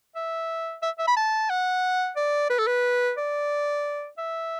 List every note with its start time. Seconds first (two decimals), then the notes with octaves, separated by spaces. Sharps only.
0.16 E5
0.82 E5
0.99 E5
1.07 B5
1.16 A5
1.50 F#5
2.16 D5
2.50 B4
2.59 A4
2.67 B4
3.17 D5
4.18 E5